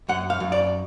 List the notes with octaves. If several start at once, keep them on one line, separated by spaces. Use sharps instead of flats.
F#2 F#5
F5
F#2
D5